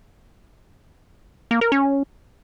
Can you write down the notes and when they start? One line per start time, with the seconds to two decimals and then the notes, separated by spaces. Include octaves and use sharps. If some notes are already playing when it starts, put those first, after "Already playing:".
1.51 A#3
1.61 A#4
1.72 C#4